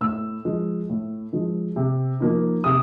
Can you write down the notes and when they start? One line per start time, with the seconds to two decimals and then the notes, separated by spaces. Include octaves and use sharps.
0.01 A2 E6
0.45 F3 G#3
0.90 A2
1.33 F3 G#3
1.76 C3
2.20 F3 A#3 D#4
2.64 C3 D#6